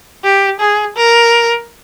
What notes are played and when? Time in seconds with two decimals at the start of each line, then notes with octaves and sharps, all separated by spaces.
0.24 G4
0.60 G#4
0.96 A#4